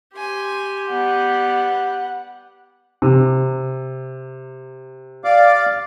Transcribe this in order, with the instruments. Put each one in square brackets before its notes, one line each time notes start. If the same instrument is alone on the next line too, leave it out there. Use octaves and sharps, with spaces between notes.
[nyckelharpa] G4 [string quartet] G#5 C6
[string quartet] G3 B3 [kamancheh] F#5
[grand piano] C3
[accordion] D5 F5 D6